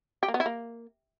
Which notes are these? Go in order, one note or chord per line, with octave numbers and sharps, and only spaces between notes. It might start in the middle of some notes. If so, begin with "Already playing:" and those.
G4
A#3
B3
E4
A#3